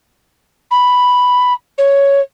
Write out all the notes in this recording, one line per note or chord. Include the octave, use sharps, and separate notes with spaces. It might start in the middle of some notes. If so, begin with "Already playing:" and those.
B5
C#5